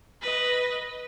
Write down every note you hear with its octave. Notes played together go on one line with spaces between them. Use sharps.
B4 D#5